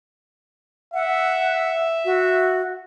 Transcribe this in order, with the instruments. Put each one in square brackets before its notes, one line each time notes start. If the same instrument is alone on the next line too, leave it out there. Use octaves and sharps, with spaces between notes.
[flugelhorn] E5 [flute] F#5
[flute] F#4